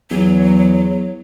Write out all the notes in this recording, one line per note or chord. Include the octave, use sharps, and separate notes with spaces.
E2 F#3